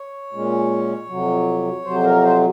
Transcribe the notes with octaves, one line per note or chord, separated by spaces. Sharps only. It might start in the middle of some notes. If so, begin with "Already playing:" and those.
Already playing: C#5
A#2 G#3 C#4
F2 C3 F#3
F2 C3 F#3 C5
A#4
C5